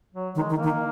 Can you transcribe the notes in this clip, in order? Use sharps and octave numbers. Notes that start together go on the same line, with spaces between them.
F#3
D#3 G#3
D#3
A#3
D#3